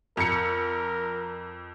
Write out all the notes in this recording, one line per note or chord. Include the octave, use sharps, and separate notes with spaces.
F2 A#4 C#7